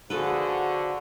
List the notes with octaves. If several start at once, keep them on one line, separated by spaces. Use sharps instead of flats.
D3 F3 F#4 G#4 A4 B4